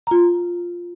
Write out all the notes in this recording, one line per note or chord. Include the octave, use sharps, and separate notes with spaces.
F4 A#5